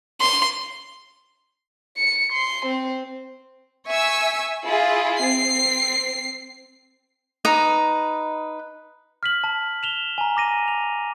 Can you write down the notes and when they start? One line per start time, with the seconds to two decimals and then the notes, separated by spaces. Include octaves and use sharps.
0.21 C6
1.97 C#7
2.32 C6
2.66 C4
3.87 E5 G#5 C#6 E6
4.65 E4 F4 G#4
5.18 C4 C7
7.45 D#4 B4 A#5 D#6
9.23 F6 B6 F#7
9.44 A5 F#7
9.83 E7 F7 G7
10.18 G#5 A#5
10.37 D6 A#6 D#7
10.68 F7